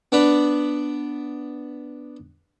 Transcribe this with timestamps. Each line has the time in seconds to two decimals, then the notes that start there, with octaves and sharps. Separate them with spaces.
0.12 B3 D4 B4 D5